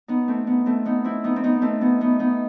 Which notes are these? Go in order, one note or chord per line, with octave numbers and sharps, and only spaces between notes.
B3 D#4
A3 C4
B3 D#4
A3 C4
B3 D#4
C4 E4
B3 D#4
C4
B3 D#4
A3 C4
B3 D#4
B3 D#4
B3 D#4